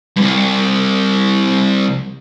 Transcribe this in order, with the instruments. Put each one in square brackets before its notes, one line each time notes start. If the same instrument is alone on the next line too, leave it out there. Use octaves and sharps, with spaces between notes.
[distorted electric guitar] C2 G2